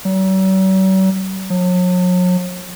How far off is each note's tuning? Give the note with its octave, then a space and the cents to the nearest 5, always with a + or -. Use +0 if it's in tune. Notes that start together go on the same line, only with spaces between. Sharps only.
F#3 +45
F#3 -40